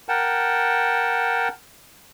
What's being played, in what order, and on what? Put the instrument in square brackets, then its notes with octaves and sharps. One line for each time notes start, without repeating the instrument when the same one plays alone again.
[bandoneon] A#4 F#5 G5 A5